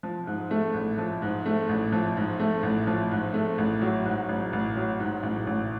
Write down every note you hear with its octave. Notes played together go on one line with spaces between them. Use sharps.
F3
G#2
A3
A1
F3
G#2
A3
A1
F3
G#2
A3
A1
F3
G#2
A3
A1
F#3
G#2
A1
A1
F#3
G#2
A1
A1